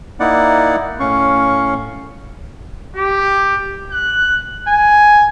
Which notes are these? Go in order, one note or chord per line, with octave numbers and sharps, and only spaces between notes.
A#3 D#4 E4 D5 F#5
A2 C#4 F5 C#6
G4
F#6
G#5